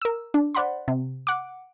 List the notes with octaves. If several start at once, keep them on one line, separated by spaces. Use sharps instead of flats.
A#4 E6
D4
C5 D5 F#5 B5 C6
C3
F#5 D6